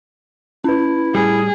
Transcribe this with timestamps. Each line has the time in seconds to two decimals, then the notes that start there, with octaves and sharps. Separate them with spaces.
0.64 C#4 E4 B4
1.15 A2 G3 G#4